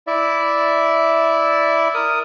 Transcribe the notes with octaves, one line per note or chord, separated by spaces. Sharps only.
E4 D5 E5
A#4 D#6